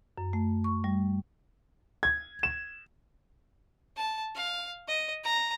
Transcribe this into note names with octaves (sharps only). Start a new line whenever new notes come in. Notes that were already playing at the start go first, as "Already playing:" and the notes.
F#2
A3
C#6
G3
G#6
E7
A5
F5
D#5
A#5